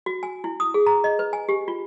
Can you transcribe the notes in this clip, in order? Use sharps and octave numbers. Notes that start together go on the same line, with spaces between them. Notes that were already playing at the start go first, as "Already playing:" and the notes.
F#4
G#5
E4
D#6
G#4
A#5
D#5
B4
G#5
G4
F4